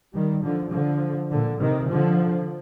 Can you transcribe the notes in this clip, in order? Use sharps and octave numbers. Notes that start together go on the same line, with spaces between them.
D#3 G3
D3 F3
D3 F3
A#2 D3
C3 D#3
D3 F3